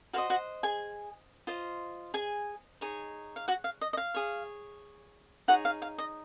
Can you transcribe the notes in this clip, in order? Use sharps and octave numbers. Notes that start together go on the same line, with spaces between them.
F#4 C5 D#5 F5
F#4 F#5
G#4 G#5
F4 C5 D#5
G#4 G#5
D#4 G#4 C#5
F5
F#4 F#5
F5
D#5
D#5
F5
G#4 C#5
D#4 F#4 G#4 C#5 F#5
F5
F5
D#5